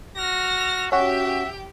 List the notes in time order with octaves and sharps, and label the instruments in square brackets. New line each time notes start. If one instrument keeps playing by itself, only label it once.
[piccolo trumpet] F#4 [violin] F6 A#6
[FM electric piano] C#4 F#4 [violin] G4 G5 [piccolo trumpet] E5